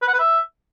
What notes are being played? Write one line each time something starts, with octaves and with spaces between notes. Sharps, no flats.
B4
F#5
B4
E5